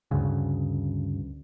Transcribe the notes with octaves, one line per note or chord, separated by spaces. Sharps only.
D2 G2 C#3